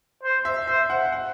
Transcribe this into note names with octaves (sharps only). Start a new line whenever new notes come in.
C5
E5
C5 E5
F#5
F#5